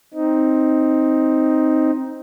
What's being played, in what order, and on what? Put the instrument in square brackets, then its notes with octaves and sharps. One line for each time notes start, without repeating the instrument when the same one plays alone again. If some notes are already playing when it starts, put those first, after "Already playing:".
[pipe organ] C4 D#4